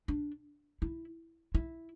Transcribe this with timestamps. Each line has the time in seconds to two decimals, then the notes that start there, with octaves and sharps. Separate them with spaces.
0.08 D4
0.82 E4
1.55 E4